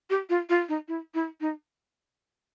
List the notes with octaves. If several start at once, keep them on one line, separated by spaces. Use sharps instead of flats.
G4
F4
F4
D#4
E4
E4
D#4